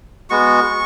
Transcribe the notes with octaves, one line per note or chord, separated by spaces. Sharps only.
G#3 B3 F#4 C#6